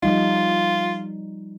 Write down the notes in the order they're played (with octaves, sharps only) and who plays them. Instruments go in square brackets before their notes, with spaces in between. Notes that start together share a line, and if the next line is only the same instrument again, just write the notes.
[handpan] F3 G3 D#4 [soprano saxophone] F4